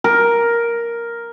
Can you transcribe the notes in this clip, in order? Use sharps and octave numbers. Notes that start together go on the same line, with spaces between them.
A#4